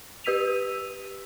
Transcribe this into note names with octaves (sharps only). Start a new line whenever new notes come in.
G4 B4 E6 B6 D#7 F7